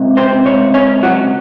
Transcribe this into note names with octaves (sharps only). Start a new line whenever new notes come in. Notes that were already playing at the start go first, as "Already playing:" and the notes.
Already playing: C#2 C3
C4 C5
C#2 C3 C#5
C#4 C#5
F#3 F#4